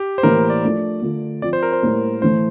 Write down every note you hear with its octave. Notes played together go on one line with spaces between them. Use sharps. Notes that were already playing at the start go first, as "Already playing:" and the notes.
Already playing: G4
C5
A2 E3 A#3 E4 A#4
D5
F3 A3 D4
D3 A3 D4 F4
F3 C4 F4 D5
C5
A#4
C5
A2 G3 A#3 E4
A2 E3 A3 C5